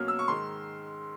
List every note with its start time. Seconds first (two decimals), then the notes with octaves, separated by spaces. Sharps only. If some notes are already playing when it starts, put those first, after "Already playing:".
Already playing: B2 F#3 A#3 C#4 F6
0.08 E6
0.19 C#6
0.28 G#2 D#3 G#3 C6